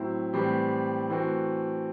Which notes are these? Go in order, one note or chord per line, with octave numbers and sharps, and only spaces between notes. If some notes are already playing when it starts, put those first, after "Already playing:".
Already playing: A2 F#3 C4 E4
A2 E3 G3 C4 G4
E3 A3 C4 F#4